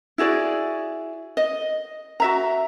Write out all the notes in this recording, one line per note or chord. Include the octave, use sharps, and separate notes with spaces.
E4 F#4 G#4 D5
D#5
F#4 E5 A#5